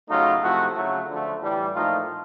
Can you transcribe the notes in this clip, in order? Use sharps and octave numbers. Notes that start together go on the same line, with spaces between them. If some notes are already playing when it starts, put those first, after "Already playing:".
C#3 F#3 A3 D#4 F4
C3 F3 A3 E4 F#4
C#3 F#3 A3
D3 F3 A3
A2 E3 G3
A#2 F3 A3 D#4 F4